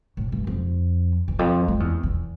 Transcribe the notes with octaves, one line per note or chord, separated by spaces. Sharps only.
A2
G2
F2
E2
F2
F2
E2
E2